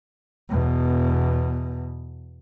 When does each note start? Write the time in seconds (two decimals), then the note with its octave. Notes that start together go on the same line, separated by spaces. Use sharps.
0.49 E2 B2